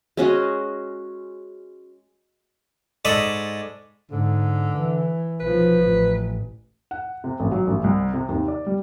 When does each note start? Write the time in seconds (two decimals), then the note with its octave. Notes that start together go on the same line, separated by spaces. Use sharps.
0.17 G#3 C#4 F#4 D#5
3.05 G#2 A4 D5 D#5 B5 C#6
4.11 G#2 D3
4.76 E3
5.40 B1 F3 B4
5.83 A1
6.91 F#5
7.24 C3
7.40 A1
7.52 F#3
7.67 A1
7.84 C2
8.14 C3
8.29 D#2
8.48 D5
8.66 G3